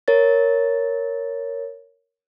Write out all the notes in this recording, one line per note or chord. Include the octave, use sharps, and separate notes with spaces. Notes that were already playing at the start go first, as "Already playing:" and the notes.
A#4 C#5 A6